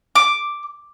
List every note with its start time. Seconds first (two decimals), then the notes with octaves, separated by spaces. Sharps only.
0.15 D6